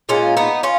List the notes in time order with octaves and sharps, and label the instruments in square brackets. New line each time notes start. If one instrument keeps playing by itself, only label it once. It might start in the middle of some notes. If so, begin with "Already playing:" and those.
[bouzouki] A#2 G#3 C#4 F4
B3 D#4
C#4 F4